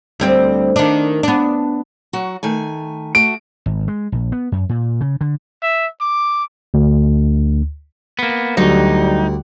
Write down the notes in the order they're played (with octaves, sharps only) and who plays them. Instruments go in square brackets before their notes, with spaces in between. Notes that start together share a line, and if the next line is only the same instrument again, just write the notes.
[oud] D2 G3 C4
D#3 D4
B3 D4
[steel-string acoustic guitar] F#3 F#4
D#3 A3 G#5
[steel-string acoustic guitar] A3 F#4 [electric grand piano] D7
[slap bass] G#1
G#3
A#1
B3
F#2
A#2
C#3
D3
[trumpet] E5
D6
[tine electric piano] D2
[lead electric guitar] A#3 B3
[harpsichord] D2 [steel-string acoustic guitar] F#3 [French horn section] G3 [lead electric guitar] D#4